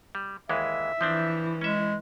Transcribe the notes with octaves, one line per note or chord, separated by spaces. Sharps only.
G3
D#2 E3 G#3 E5
E3 F3 C4 D4
G#3 C#4 E5